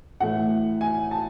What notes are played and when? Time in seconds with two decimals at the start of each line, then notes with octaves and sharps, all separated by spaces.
0.20 A2 E3 A3 F#5
0.81 G#5
1.11 A5